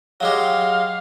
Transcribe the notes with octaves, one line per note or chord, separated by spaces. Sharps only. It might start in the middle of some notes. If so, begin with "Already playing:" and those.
F#3 G#3 G4 F5